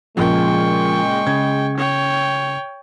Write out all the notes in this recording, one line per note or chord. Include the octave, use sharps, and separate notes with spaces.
A#2 C#3 F3 G#3 G5 C#6
C#3 G#6
C#5 G5